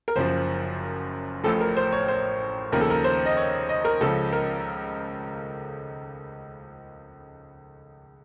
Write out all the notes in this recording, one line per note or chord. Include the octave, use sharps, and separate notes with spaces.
A#4
F#1 F#2 F3 C5
A1 A2 F3 A4
A#4
C5
C#5
C5
D#2 C#3 F3 A#4
A4
A#4
C5
D#5
C#5
D#5
A#4
C#2 C#3 F3 A4
A#4